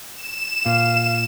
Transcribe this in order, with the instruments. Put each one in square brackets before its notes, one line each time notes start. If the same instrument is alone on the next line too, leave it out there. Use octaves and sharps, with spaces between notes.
[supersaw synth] E7
[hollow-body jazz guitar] A#2 [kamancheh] F5